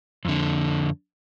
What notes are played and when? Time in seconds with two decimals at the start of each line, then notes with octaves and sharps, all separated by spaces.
0.25 F2 D3